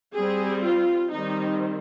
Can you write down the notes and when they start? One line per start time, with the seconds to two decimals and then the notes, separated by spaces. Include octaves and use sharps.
0.15 G3 C4 G#4
0.63 F4
1.12 D#3 G3 C4 D#4